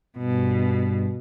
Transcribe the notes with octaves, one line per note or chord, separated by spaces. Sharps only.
G2 B2